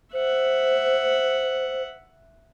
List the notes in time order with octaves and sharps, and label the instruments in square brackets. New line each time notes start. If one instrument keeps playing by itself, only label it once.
[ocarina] C5 [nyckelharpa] E5 F#5